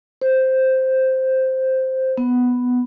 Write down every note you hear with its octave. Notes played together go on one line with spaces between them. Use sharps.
C5
B3